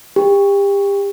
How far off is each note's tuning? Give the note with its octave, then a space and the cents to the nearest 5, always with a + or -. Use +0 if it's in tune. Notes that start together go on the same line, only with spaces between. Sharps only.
G4 +30